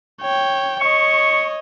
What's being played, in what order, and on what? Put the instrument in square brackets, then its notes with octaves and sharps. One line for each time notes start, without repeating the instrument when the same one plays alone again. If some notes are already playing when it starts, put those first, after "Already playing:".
[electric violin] C#5 G5
[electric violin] C#5 D#5 [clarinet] C#6